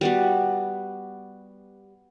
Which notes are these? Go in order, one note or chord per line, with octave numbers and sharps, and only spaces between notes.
G3 B3 F#4